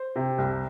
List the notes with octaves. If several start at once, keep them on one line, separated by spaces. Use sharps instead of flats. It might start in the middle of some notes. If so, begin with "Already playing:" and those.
Already playing: C5
C3
C2